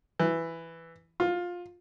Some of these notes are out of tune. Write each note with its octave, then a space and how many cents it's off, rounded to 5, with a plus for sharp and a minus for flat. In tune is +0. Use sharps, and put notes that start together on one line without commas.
E3 +5
F4 +15